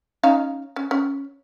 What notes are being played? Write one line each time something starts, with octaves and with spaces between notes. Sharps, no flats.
C#4 D#4 F5
C#4
C#4